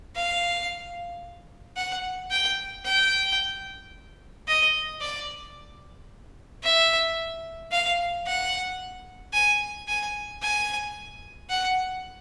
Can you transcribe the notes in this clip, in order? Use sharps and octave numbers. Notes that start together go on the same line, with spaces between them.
F5
F#5
G5
G5
D#5
D5
E5
F5
F#5
G#5
G#5
G#5
F#5